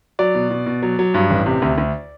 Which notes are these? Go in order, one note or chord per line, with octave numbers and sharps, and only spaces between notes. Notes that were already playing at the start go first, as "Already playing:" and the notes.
F#3 D5
B2
B2
B2
F#3
F#3
G2
A1
C3
D2
D2